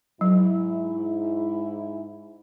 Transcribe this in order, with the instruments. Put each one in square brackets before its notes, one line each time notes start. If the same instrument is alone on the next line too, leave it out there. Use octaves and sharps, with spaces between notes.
[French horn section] G#2 E4 [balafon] F#3